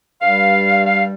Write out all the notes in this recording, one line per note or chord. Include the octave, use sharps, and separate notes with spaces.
G2 G3 F5
F5